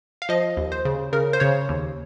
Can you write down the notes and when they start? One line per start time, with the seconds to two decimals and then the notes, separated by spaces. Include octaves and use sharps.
0.22 F5
0.29 F3 D#5
0.57 D#2
0.72 C5
0.85 C#3
1.13 C#3 A#4
1.33 C5
1.40 C#3 C#5
1.69 D#2